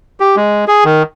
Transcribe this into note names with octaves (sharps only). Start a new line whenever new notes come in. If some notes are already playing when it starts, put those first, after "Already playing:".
G4
G#3
G#4
D#3